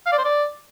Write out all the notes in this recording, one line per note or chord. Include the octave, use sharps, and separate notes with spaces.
F5
D5
C5
D5